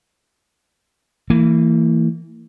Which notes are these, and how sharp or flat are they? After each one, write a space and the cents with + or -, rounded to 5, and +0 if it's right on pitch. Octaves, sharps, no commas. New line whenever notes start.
E3 +0 A#3 -35